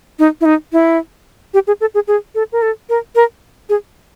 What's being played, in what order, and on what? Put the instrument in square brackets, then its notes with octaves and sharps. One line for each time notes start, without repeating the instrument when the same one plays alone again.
[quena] D#4
E4
D#4
E4
G4
G#4
A4
G#4
G#4
A4
A#4
A4
A#4
A#4
G#4